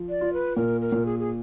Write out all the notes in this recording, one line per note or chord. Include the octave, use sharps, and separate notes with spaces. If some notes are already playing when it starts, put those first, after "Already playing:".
Already playing: F3
D5
F4
B4
A#2 A#4
A#4
A#2
G#4
G#4